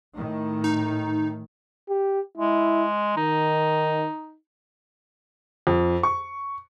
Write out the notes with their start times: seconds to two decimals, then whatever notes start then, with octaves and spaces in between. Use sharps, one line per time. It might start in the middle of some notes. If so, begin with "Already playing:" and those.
0.14 A2 D#3
0.64 D#4
1.89 G4
2.38 G#3 E4
3.17 D#3 D#4
5.67 F2
6.03 C#6